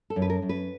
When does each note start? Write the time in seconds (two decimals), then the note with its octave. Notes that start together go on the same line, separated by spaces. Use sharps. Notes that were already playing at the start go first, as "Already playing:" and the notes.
0.10 A4
0.16 F#2
0.22 B4
0.30 A#4
0.42 F#2
0.49 B4